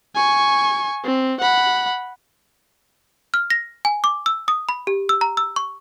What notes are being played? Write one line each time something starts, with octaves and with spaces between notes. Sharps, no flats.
G#5 C#6
C4
F#5 B5
F6
A#6
G#5
D6
E6
D#6
B5
G4
E6
A#5
E6
C#6